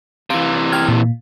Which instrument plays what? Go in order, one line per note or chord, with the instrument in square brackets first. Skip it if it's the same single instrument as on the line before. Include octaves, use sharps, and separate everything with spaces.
[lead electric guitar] C3 E3 [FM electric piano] F5
[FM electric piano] G5 F6 G#6
A#2